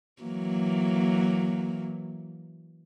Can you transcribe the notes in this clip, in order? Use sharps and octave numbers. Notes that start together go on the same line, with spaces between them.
E3 F#3 A#3